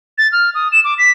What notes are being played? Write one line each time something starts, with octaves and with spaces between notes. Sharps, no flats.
A6
F6
D#6
E7
D6
B6